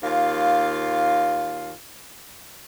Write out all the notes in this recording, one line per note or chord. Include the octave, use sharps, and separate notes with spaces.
D#2 F4 F5